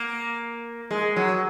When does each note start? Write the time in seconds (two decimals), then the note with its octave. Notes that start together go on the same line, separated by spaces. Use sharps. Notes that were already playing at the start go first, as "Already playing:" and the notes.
Already playing: A#3
0.91 G#3
1.16 F#3